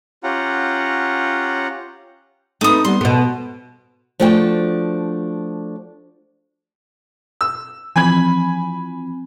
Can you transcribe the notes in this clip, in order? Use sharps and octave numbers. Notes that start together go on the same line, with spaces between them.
C#4 F4 G4 F#5 A#5
A3 C4 D#4 B4 D#6
G3 B3 C6
B2 A3 B3
F3 A3 D4 F#4 G5
E6
E3 F3 C4 G#5 B5 G#6